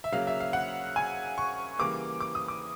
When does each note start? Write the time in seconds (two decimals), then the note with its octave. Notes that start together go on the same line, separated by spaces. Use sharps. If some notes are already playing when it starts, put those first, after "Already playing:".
0.04 E5
0.12 C#3 F#3 A#3 F5
0.27 E5
0.40 F5
0.53 F#5
0.96 G#5
1.38 C#6
1.79 C#3 E3 G3 A#3 D6
2.20 D6
2.35 D#6
2.48 D6